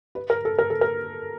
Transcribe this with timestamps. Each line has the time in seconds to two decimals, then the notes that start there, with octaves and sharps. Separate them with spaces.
0.15 B4
0.30 A#4
0.45 A4
0.58 A#4
0.70 A4
0.81 A#4